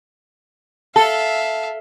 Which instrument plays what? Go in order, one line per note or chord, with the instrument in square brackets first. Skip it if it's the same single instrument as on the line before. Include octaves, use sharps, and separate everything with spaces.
[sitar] A4 [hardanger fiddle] E5 F5